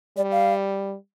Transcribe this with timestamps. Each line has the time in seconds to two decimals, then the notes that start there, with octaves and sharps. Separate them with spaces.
0.17 G3 D5
0.32 F5